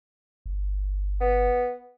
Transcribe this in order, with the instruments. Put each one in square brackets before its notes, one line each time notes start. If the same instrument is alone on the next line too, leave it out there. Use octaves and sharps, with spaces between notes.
[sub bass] G1
[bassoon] B3